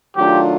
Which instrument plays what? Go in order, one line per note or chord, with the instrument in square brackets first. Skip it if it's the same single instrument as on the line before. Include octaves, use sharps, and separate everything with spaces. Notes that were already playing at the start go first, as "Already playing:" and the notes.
[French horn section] D#3 F#3 A3 D4 F4 [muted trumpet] G4